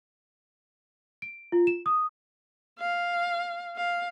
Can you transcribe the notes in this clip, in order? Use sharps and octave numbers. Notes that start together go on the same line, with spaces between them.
D7
F4
E7
D#6
F5
F5